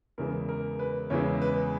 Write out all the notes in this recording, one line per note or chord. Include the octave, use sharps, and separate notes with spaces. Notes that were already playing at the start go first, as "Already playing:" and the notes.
E2 C#3 E3 G#3 A#4
A#4
B4
E2 C#3 E3 G#3 C#5
B4